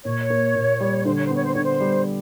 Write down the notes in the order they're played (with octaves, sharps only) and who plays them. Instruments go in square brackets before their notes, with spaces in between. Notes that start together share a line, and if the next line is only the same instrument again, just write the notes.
[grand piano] A#2 [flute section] C#5
[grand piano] A#3
A#2
G3
[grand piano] D3 [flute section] C5
[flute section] C#5
C5
[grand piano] B3 [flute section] C#5
[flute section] C5
[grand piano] D3 [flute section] C#5
[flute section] C5
[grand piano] G3